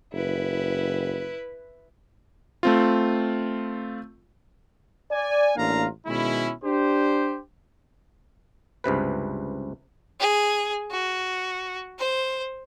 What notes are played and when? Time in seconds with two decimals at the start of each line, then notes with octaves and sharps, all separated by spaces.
0.13 F#1 E4 B4
2.63 A3 C4 F4
5.11 D5 G#5
5.57 A1 A#3 D4 F4 F5 A#5
6.07 B2 D#3 G#3 C#4 E4
6.64 D4 G4 C5
8.84 C#2 G2 C3 B4
10.20 G#4
10.91 F#4
11.99 C5